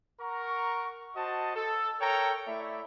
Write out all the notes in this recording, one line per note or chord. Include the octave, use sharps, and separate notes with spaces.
A#4 F#5 A#5 C#6
F#4 C5 D#5 A5
A4
A4 A#4 C#5 G5 A#5
A3 E4 D5 E5